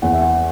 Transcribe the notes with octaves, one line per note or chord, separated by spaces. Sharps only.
E2 F#5
E5
F#5